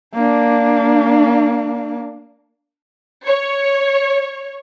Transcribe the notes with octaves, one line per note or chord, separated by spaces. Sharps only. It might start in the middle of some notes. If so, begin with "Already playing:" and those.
A#3 D4
C#5